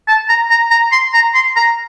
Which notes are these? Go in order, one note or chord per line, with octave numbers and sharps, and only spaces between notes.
A5
A#5
A#5
A#5
C6
A#5
C6
A#5